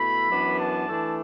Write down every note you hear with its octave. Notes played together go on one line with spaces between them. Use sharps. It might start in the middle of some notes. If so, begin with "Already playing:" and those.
Already playing: B2 A3 E4 B5
F#2 E3 B3 D4
A5
E3 A3 D4